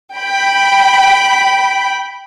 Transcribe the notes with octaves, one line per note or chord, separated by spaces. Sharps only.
G5 B5